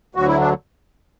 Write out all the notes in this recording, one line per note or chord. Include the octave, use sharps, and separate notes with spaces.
D2 D3 F#3 F#4
E4
D4